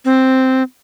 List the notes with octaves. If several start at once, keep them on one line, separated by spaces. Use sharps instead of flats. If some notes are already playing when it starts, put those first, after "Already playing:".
C4